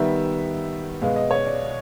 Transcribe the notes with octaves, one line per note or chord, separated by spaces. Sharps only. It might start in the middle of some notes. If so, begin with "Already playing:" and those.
Already playing: D#3 G3 B3 E5
B2 G#3 B3 F5
D#5
C#5
D5